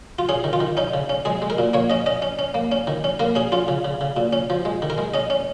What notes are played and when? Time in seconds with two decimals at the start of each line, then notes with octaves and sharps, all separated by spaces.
0.19 F4
0.29 C#4 G#4
0.44 D#3
0.53 F4
0.60 D#3
0.77 C#4 D#4
0.94 C#3
1.09 C#4
1.25 G#3 G#4
1.42 G#3
1.50 A#4
1.58 A#2
1.73 A#3 C#5
1.90 C#4 D#5
2.06 C#4 D#5
2.22 C#4
2.39 C#4
2.54 A#3
2.72 C#4
2.87 D#3
3.04 C#4
3.19 A#3 A#4
3.35 C#4 G#4
3.52 C#4 F4
3.68 C#3
3.85 C#3
4.01 C#3
4.17 A#2
4.33 C#4
4.50 F3
4.65 G#3
4.82 D#3
4.90 A#4
4.98 G#3
5.14 C#4 D#5
5.30 C#4